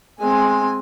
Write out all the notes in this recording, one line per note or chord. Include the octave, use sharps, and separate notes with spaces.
G#3 C4 G#5